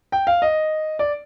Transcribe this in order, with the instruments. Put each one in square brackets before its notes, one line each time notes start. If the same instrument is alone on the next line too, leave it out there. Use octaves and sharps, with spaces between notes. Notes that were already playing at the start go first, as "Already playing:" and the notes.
[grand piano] G5
F5
D#5
D5